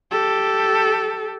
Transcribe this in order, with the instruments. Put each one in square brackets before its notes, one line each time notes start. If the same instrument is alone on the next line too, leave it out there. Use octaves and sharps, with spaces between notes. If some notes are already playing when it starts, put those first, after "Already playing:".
[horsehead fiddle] G4 A4